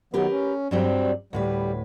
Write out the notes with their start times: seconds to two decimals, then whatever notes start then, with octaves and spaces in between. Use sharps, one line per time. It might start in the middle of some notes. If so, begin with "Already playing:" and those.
0.14 D#3 F#3 B3 G4 A#4 B4
0.30 C#4
0.71 G2 F#3 G3 C4
1.33 D2 A2 G3 B4